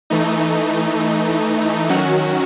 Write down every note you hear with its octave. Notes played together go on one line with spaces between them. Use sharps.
E3 A3 D#4
D#3 F#3 C#4 F#4